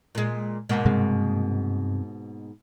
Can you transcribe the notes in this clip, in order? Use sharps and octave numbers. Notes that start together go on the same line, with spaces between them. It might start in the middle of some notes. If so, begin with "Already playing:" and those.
A#2 G#3
G#2 B2 A#3
G2 C3 G#3